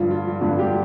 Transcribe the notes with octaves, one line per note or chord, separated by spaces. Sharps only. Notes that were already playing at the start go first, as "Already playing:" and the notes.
Already playing: G2 D3 F3 F4
F4
G2 D3 F3 F4
G4